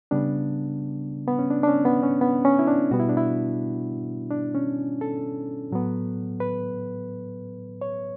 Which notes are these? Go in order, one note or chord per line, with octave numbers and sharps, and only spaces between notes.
C#3 G3 B3 D4
B3
C#4
D4
D4
C#4
B3
C#4
B3
C#4
E4
D4
B2 G3 B3 F#4
E4
D4
E4
D4
C#4
A4
A2 F#3 B3
B4
C#5